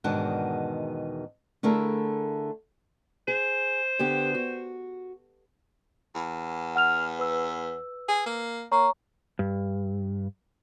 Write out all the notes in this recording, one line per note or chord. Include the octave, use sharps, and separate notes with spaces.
E2 G#2 B2 D#3 D4 F#5
D3 A3 E4 G#4 A#4
G#4 C5
D3 B3 G4
F#4
E2
F#5 F6 F7
B4 E6
G#4
A#3
A#3 C#5 A#5 C#6
G2